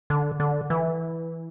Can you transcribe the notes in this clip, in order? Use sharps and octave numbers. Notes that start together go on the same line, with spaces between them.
D3
D3
E3